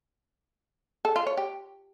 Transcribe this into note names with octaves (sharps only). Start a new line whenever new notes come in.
A4
F4
C#5
G4